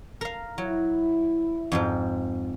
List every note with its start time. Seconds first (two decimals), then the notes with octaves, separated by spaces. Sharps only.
0.21 A#4 F5
0.58 F#3 E4
1.72 F2 G#2 F3